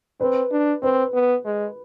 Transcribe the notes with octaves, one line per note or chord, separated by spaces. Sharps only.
C4 B4
D4
C4 B4
B3
G#3